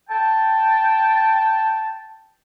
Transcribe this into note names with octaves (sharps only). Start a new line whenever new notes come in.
G5 A5